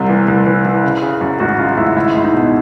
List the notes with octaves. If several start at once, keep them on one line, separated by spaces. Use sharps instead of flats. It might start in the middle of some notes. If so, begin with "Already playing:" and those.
Already playing: C2 C3
E3
C2
E3
E3
C#3
C#3
F#2
G#1 F#4
C#3 F4
G#1 E4
C#2 E4
C#2
D#4
B2